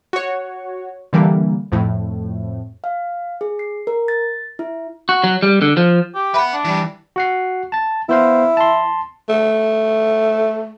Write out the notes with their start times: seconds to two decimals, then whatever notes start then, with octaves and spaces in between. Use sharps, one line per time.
0.13 F#4 C#5
1.13 D3 E3 G3 A#3
1.72 F2 A2
2.84 F5
3.41 G#4
3.59 C7
3.87 A#4
4.08 A6
4.59 E4
5.09 F#4
5.24 F#3
5.43 G3
5.62 D3
5.77 F3
6.15 G4
6.34 B4 E5 F#5 B5
6.53 D4
6.65 E3 G3
7.16 F#4 F#5 C7
7.72 A5 A6
8.09 B3 E4 C5 F5
8.57 A5 C6
9.29 A3